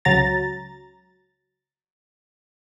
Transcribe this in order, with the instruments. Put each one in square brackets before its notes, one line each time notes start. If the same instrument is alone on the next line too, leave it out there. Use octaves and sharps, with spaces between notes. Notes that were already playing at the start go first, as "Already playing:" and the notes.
[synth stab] C#2 C#3 F#3 A#5 A6